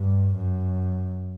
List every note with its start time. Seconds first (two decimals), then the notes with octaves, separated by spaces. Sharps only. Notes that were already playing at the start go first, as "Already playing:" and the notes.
Already playing: G2
0.35 F#2